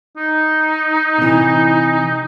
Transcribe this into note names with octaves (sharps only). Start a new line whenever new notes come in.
D#4
C3 E3